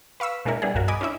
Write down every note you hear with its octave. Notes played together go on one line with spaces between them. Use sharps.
B4 F5 C#6 E6 B6
B2 G#3 A#3 D4 E4 A#4
G3 B3 D4 E4 G#4
B1 G2 F#4 A#4
D#5 G#5 B5 D6 D#6
C#4 D4 E4 E5